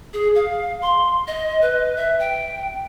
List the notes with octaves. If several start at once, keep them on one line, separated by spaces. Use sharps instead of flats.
G#4
F5
C6
D#5
B4
E5
G5